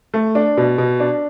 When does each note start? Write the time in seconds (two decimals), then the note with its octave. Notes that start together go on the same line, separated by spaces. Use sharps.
0.14 A3
0.35 D4
0.57 B2
0.78 B2
1.00 D4